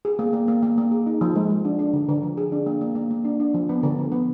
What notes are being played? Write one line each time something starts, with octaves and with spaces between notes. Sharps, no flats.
G#4
A#3
A#3
A#3
A#3
A#3
G#4
D#4
F3
G#3
G#3
D4
D4
D3
D3
F3
G#4
D4
A#3
A#3
A#3
A#3
D4
D4
F3
B3
D3
F3
B3